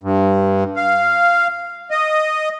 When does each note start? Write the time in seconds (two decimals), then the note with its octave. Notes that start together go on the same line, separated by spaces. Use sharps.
0.03 G2
0.76 F5
1.91 D#5